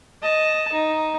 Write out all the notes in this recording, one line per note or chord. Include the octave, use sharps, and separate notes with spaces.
D#5 A5
D#4